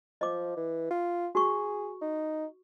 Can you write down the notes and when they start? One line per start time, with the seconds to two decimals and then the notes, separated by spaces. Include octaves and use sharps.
0.21 F3 D#5 D6
0.57 E3
0.91 F4
1.35 F#4 G#4 C#6
2.02 D#4